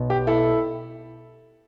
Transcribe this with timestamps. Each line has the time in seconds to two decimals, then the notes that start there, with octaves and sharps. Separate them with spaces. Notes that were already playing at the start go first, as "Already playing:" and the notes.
Already playing: B1 B2
0.10 G4
0.27 E4 A4